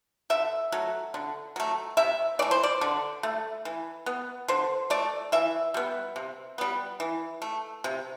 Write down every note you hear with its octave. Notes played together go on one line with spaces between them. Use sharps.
D3 E5
F#3 A3
D3
F#3 A3
C3 E5
E3 A3 D5
C5
D5
D3
A3
E3
B3
D3 C5
A3 D5
E3 E5
G3 B3
C3
G3 B3
E3
A3
C3